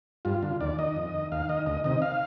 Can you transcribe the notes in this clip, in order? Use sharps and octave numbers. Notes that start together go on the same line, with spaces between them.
G2 F4
D3
D#2 D5
D#3 D#5
F2
D#3
D#2 F5
D#3 D#5
D2 D#5
C3 D#3 D#5
F5